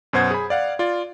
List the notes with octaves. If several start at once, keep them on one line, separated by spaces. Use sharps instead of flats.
F#2 B2 C5 F#5 G#6
G#4 B5
D5 F5 F#5
F4 D5